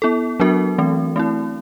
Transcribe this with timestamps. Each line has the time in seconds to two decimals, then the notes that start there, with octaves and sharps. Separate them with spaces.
0.02 B3 E4 A4
0.40 F#3 B3 D4 F#4 A#4
0.78 E3 A3 C4
1.16 A3 C4 E4